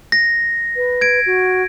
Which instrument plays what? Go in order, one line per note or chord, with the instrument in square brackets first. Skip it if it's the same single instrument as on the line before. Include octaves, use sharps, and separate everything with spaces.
[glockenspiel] A#6
[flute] B4
[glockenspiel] G#6 D7
[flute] F#4